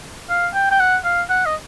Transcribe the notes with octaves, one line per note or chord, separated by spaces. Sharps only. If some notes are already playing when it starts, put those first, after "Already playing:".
F5
G5
G5
F#5
F5
F#5
D#5